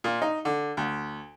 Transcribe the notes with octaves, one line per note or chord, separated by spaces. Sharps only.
A#2
D#4
D3
D2